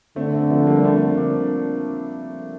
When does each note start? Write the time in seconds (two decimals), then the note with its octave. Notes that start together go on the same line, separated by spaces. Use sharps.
0.16 D3 A3 C4
0.33 A3 C4
0.51 F3 A3
0.67 G3 A#3
0.84 A3 C4
1.17 A#3 D4